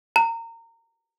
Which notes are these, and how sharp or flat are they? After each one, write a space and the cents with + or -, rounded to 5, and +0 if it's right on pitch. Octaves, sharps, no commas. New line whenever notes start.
A#5 -25